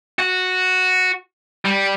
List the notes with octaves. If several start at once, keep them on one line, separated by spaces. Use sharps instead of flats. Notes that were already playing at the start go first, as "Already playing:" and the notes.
F#4
G3